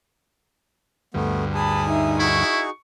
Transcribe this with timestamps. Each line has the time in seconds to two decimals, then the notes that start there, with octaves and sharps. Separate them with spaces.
1.14 D2 G2 A3 B3
1.55 G#4 G#5 A5 B5 D#6
1.89 D#4 E5
2.19 D#4 E4 F#4 G#4 C#6